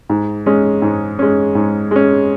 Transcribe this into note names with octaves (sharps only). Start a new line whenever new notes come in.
G#2
G#3 C#4
G#2
G#3 C#4
G#2
G#3 C#4